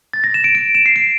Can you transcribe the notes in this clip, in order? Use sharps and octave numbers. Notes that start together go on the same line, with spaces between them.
A6
A#6
E7
D7
D7
E7
C7
D7